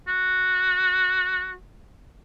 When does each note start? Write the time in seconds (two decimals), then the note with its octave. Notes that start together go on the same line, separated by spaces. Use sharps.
0.08 F#4